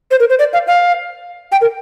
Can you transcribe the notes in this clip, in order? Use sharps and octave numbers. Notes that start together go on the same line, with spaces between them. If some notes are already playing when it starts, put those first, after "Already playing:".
C5
A#4
C5
D5
F5
F5
G5
A#4